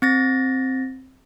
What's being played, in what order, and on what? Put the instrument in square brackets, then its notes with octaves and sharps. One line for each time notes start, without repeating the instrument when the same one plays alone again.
[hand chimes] C4 A6 A#6